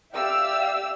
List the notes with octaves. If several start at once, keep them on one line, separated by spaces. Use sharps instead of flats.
G4 D5 E5 F5 E6